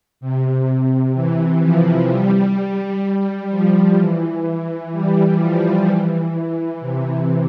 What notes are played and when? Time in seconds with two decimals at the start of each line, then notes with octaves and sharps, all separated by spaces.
0.21 C3
1.15 E3
1.62 F3
2.10 G3
3.04 G3
3.51 F3
3.98 E3
4.92 G3
5.40 F3
5.86 E3
6.81 C3